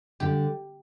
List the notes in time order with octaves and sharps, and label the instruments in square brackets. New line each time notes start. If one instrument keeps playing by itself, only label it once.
[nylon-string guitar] D3 G3 [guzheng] G4